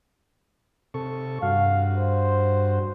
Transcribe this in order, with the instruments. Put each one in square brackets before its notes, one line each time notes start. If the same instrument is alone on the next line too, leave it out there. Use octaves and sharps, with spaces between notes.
[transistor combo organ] C3 A4 C#6
[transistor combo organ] G2 F#4 [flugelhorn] F5
[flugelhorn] C5